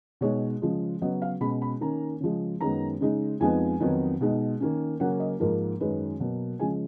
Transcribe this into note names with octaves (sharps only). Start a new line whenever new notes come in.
B2 G#3 D#4 C#5
C#3 F3 G#3
C#3 F#3 B3 D#5
F5
B2 G#3 C#4 B5
B5
D#3 A#3 C#4 A#5
C#3 F3 G#3
F#2 D#3 G#3 B3 A#5
C#3 G#3 D#4
F2 F3 G#3 B3 D#4 G#5
F2 D#3 F#3 B3 D#4
B2 G#3 D#4
D#3 A#3 C#4
C#3 F#3 A#3 C#4 F#5
D#5
G#2 F3 A#3 D#4 A#4
F#2 D#3 G#3 C#4 B4
B2 F#3 A#3
C#3 F3 G#3 G#5